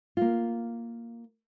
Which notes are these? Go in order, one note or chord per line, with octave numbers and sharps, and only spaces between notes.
A#3 F4